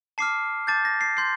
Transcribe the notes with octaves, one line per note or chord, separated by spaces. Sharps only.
A5 D6 F6 C7
A5 D6 G6 A6
A#6
C7
C6 G6 C7